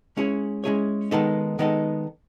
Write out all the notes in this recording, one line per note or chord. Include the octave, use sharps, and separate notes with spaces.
G#3 C#4 E4 G#4 C#5
G#3 C#4 E4 G#4 C#5
D#3 G#3 B3 D#4 A4
D#3 G#3 B3 D#4 A4